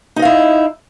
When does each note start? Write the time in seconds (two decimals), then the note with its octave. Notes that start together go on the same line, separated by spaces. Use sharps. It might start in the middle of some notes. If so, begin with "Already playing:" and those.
0.16 D#4
0.19 D#5
0.22 F5
0.25 E4